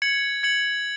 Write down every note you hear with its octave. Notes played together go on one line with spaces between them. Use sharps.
G#6 C#7 F#7
G#6 C#7 F#7